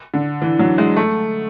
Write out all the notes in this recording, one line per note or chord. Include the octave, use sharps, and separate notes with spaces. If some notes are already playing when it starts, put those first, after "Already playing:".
D3
E3
F#3
G#3
A3